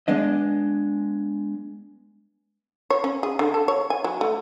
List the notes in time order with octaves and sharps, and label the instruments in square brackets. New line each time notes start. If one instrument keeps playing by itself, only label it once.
[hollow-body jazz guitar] G#3 B3 D4 D#5
[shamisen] C#5
C#4
G#4
D3
A4
C#5
G#5
F#3
A3